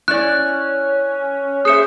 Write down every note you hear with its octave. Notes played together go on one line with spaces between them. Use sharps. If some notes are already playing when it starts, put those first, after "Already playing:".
C#4 E4 D5 F#6
G#4 C5 E5 D#6 C#7